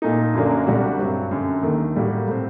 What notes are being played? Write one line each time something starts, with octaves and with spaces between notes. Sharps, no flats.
A#2 A3 D#4
F#2 D3 F#3 A#3 D4
C2 C3 G3 D4 F#4
G2 F#3 C4
F#2 D3 A3
D#2 D#3 A3
A2 G3 A#3 F#4
A2 A3 C4